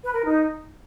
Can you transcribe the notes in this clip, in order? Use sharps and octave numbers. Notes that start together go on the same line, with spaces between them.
B4
A#4
D#4